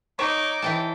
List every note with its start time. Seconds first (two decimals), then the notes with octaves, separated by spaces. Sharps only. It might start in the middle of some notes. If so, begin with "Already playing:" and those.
0.19 D#4 C#5 D6
0.62 E3 G5 A5